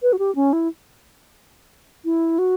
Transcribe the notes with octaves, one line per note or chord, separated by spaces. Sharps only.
B4
F#4
G4
C#4
E4
E4
F#4